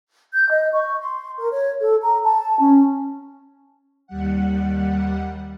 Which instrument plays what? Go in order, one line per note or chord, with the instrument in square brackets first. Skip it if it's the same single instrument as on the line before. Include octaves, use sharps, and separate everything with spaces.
[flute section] G6
D#5
C#6
C6
A#4
C#5
A4
A#5
A5
C#4
[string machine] D#2 G3 F#5